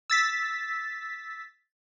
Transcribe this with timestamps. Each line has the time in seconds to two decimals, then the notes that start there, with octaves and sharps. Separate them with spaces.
0.10 E6 A6 B6